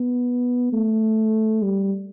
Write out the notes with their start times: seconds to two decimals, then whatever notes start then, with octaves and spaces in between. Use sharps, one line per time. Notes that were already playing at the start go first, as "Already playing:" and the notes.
Already playing: B3
0.73 A3
1.62 G3